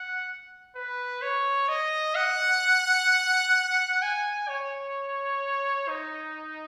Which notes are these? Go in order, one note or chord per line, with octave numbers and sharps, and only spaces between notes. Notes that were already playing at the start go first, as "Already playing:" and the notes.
Already playing: F#5
B4
C#5
D#5
F#5
G#5
C#5
D#4